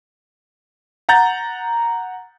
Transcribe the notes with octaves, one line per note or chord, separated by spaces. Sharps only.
F#5 A#5 G6 A6